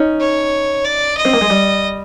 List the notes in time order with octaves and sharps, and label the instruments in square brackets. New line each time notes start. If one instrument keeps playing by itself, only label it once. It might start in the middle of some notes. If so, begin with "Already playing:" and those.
Already playing: [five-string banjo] C#4 D#4
[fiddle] C#5
D5
D#5
[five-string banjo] C4
A#3
G#3
G3